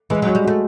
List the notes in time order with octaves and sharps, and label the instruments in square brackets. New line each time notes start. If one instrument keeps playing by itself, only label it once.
[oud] E3 [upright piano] G#3
[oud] F#3 [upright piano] F#4
[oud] G3
[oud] A3 [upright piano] F#4